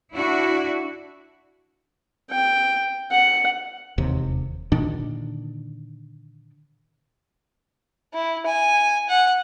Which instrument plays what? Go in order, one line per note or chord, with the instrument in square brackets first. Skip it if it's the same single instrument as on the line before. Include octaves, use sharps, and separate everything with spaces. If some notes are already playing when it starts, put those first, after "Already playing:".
[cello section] D4 E4 F#4
[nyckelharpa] G5
F#5
[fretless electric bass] E1 D#2 C3
A#2 D3 D#3 D4
[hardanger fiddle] E4
G#5
F#5